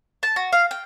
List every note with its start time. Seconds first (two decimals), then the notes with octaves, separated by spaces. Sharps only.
0.23 A5
0.36 F#4
0.53 F5
0.71 G5